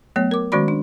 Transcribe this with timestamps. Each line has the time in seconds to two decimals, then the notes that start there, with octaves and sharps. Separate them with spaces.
0.16 F#3 A3 B3 C#5
0.31 A#4 D6
0.52 D#3 G#3 C#4 F#4 D5 B5
0.68 D4